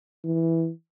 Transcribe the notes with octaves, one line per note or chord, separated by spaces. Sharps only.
E3